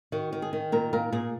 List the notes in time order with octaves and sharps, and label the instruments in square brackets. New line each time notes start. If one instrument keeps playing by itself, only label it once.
[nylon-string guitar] D#3 F#4
D#3
G#4
D#3
A#2 A#4
A#2 A#4
A#2 G#4